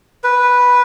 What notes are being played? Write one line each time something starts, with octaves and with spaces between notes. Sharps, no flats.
B4